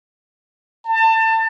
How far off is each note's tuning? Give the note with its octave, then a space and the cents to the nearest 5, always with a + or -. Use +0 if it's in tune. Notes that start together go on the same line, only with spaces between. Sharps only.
A5 +25